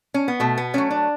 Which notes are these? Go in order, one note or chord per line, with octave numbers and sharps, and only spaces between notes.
C#4
B3
B2 A3
B3
F#3 A3 C#4
D4